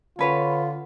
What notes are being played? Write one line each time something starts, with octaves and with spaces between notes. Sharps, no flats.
D3 C#4 F4 B4 C#5